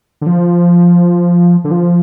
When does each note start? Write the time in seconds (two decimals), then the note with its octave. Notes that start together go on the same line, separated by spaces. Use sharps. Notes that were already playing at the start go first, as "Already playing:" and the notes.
0.21 D3
0.26 F3
1.64 D3
1.71 F3